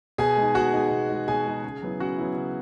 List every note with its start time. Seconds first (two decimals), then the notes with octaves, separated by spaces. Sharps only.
0.18 B2 G#4 G#5
0.36 G#3 D#4
0.55 B2 F#4 F#5
0.73 G#3 D#4
0.91 B2
1.09 G#3 D#4
1.28 B2 G#4 G#5
1.46 G#3 D#4
1.64 C#3
1.82 F#3 B3 E4
1.99 C#3 F#4 F#5
2.18 F#3 B3 E4
2.36 C#3